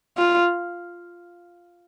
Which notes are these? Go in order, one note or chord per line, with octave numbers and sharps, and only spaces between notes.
F4